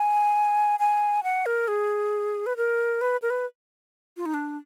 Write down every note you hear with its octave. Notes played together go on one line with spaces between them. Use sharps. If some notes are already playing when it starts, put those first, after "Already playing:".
Already playing: G#5
G#5
F#5
A#4
G#4
B4
A#4
B4
A#4
B4
F4
D#4
D4